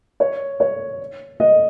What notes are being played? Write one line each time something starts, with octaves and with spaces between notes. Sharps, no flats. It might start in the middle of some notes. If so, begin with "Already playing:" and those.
C#5
C#5
D#5